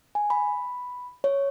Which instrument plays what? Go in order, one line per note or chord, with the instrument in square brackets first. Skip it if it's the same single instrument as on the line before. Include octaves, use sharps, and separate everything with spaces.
[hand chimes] G#5
B5
C#5